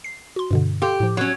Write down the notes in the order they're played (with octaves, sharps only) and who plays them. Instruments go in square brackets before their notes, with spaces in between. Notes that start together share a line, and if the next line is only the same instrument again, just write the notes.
[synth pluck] C7
F#4 C6
G2 B2 D3
[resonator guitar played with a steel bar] G4 [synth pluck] A4 F5 C6
[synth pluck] A2 F3
[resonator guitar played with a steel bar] F#3 C#4